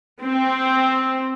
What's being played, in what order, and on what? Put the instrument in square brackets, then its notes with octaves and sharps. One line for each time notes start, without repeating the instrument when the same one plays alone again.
[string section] C4